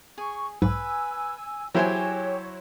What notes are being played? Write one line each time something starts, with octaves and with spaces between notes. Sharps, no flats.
G#4 C#6
B1 G#2 B4 G#5 E6
F#3 E4 G4 G#4 C5 C#5 G#5